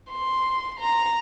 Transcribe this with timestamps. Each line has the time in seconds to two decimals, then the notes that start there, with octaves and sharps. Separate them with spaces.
0.11 C6
0.80 A#5